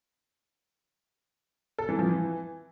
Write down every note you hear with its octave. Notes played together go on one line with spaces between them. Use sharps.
A4
E3
F3
E3